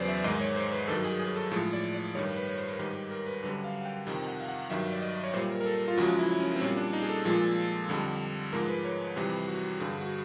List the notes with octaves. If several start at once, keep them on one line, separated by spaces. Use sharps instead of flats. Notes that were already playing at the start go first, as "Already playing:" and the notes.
Already playing: E2 C#3 F#3 B4 C5 D5
E5
G#2 D#3 G#3 D#5
C#5
C5
B4
G2 D#3 F#3 A4
G#4
G#4
A4
A2 F3 G#3 A4
D5
D5
G2 D#3 G3 C#5
B4
C#5
C5
A#4
G#2 D#3 G3 B4
A#4
B4
F#2 D3 G3 B4
F5
F#5
G5
F2 C3 D#3 G5
F#5
F5
F#5
G2 D#3 F#3 E5
D5
D#5
C#5
A#2 G3 C5
A#4
A#4
A4
F4
F#2 C#3 F3 G#3 F#4
E4
C#4
C4
A#2 G3 C#4
D4
D#4
G#4
A4
A#2 F3 G#3
F2 D3 G3
G#2 F3 G#3 A#4
B4
C#5
F2 C3 E3 G3 C5
F#4
G2 D3 G3 G#4
F#4